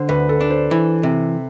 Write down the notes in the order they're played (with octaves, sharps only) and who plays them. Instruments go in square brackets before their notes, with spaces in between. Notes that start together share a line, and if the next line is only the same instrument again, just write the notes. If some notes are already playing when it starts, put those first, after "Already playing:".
Already playing: [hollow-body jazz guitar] D3 [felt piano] C5
[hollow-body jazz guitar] D2 [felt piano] B4
[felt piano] A4
[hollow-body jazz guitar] D4
[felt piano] C5
[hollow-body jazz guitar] E3
C3